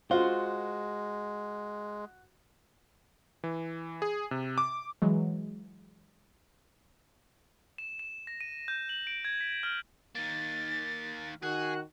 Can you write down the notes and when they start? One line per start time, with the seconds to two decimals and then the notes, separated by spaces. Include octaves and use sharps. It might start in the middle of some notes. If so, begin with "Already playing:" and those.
0.11 G#3 F4 F#4 C5 F#5
3.44 E3
4.02 G#4
4.31 C3
4.58 D6
5.02 E3 F#3 G#3
7.78 E7
7.99 E7
8.27 A#6
8.41 D#7
8.68 G6
8.89 F#7
9.07 D7
9.25 G#6
9.41 B6
9.63 F6
10.15 D#3 A#3 A6
11.43 D#3 F#4 G#4 F#6